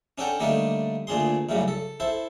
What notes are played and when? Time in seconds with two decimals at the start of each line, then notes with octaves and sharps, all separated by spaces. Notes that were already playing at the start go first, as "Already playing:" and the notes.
0.18 C#4 D4 A4 F#5 G5 A#5
0.40 D3 G3 A3 A#3 D4 D#4
1.07 D2 A#2 D4 G#4 C6
1.49 F#2 A2 C#3 F#3 G3
1.68 A4
2.00 E4 A4 C5